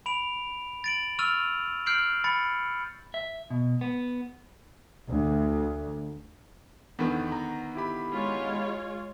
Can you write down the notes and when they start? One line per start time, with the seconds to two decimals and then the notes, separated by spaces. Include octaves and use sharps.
0.06 B5 D7 F7
0.84 A6 D7 F#7
1.19 C#6 E6 F6 A6 D#7 F7
1.86 F6 G6 C7 D7 F#7
2.24 B5 A6 C#7
3.14 E5
3.50 B2
3.81 B3
5.09 D2
6.99 E2 D3 D#3 B3
7.32 A#5
7.75 E4 G4 B5
8.10 G#3 F4 C#5